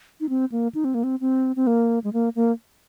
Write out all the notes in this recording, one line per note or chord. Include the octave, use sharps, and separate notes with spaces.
D#4
C4
A#3
D#4
C4
A#3
C4
C4
C4
A#3
G#3
A#3
A#3